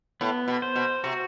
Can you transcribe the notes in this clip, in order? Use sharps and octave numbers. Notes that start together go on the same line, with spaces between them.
A2 B3
B2
C5
B2
C3 F#4